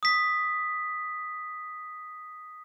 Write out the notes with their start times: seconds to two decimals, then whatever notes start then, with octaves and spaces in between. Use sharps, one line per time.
0.03 D#6 B6